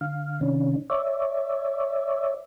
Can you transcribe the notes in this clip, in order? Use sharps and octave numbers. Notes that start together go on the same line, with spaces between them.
D3 F5
C3 D#3 C#4 D4
C#5 D5 E5